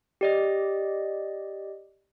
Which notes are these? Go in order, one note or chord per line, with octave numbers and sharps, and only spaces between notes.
G4 D5 D#5